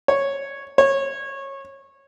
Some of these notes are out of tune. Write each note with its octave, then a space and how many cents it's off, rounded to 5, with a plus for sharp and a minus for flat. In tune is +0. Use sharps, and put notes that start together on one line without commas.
C#5 -5
C#5 -20